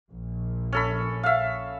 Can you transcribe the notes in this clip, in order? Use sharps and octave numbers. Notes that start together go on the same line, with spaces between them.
A#1
C#4 A4 B5
E5 F5